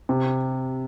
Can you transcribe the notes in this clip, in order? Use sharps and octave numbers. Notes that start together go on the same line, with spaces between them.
C3